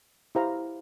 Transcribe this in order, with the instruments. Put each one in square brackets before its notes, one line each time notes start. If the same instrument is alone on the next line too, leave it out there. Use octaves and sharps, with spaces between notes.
[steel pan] E4 G4 C5 F5 A#5